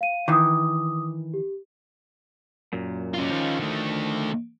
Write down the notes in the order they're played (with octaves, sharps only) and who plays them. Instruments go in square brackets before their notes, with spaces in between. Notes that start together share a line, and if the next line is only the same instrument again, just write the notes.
[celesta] F5 D#7
[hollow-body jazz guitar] D#3 E3 [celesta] D6 D#6
[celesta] G4
[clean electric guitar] F#2 A#2
[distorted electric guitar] C#4 F4
[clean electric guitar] D#3 F3
[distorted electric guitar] D3 A3